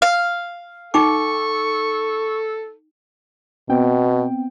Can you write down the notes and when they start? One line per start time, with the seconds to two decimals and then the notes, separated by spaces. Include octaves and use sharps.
0.02 F5
0.94 D#4 A4 G5 C#6 D6
3.69 B2 B3 C4 G5